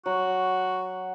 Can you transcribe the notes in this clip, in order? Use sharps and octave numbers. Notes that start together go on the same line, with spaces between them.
F#3 F#4